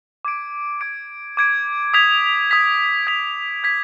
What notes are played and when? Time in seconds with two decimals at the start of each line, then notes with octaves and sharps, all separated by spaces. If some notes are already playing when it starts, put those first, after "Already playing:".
0.25 D6 G#6 D7
0.81 D6 G#6 D7
1.37 D6 G#6 D7
1.94 D#6 G#6 B6 F7
2.50 D#6 G#6 B6 F7
3.07 D#6 G#6 B6 F7
3.63 D#6 G#6 B6 F7